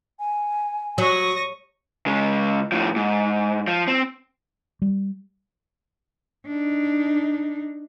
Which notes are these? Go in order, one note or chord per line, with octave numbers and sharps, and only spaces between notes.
G#5
F#3 C#6 D#6 A#6
C#3 G#3
A2 F3
G#2
F3
C4
G3
D4 D#4